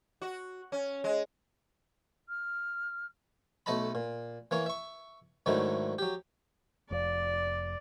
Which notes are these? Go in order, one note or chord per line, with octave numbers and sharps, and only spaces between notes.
F#4
C#4
G#3
F6
B1 A3 A4 D#5 A5 B5
A#2
E3 A#3 C#5
E5 C#6
G#2 D3 D#3 F#3 A3 E4
F#3 G4
F1 F2 D5